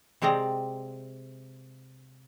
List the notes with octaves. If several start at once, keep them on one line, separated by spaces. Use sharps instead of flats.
C3 G#3 C4 D5 A#5